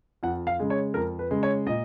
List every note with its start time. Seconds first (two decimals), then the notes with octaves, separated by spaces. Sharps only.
0.23 F2 F#5
0.47 F5
0.60 C#3 G#3
0.70 C#5
0.94 F2 A#4
1.19 B4
1.30 C#3 G#3
1.43 C#5
1.67 A#2 D#5